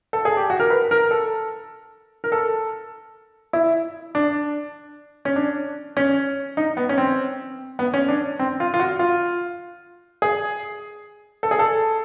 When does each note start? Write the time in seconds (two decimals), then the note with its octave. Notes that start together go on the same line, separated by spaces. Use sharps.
0.13 A4
0.25 G#4
0.37 G4
0.50 F#4
0.60 A#4
0.70 B4
0.91 A#4
1.11 A4
2.24 A#4
2.32 A4
3.53 E4
4.15 D4
5.25 C#4
5.36 D4
5.97 C#4
6.57 D#4
6.77 B3
6.89 C#4
6.98 C4
7.79 B3
7.94 C#4
8.08 D4
8.39 C4
8.60 F4
8.74 F4
8.80 F#4
8.99 F4
10.22 G#4
11.43 A4
11.51 G#4
11.59 A4